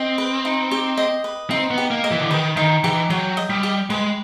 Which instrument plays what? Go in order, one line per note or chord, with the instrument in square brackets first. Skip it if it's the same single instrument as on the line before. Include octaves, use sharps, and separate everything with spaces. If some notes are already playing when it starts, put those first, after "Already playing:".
Already playing: [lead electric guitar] C4 [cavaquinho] D#5
[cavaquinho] B4
D#4
G4
D#5
B4
[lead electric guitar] C4 [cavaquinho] D#4
[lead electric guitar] B3
[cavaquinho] G4
[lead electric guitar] A#3
[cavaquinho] D#5
[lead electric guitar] E3
D3
[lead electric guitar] D#3 [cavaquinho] B4
[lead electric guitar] D#3 [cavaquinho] D#4
[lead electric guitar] E3 [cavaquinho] G4
[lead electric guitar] F#3 [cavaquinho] G5
[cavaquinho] D#5
[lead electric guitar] G3
[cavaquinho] G4
[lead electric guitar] G#3 [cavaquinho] B4